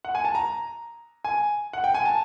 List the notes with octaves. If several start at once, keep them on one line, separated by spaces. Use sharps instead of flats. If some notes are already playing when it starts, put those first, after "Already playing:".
F#5
G#5
A5
A#5
G#5
F#5
G5
G#5
A5